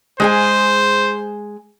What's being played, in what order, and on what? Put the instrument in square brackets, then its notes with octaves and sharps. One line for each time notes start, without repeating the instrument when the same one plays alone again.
[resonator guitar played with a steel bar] G#3 G#4 G#5 [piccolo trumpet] C5